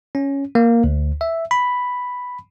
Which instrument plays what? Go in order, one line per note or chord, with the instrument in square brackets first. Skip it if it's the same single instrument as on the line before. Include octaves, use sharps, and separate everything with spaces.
[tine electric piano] C#4
A#3
D2
E5
B5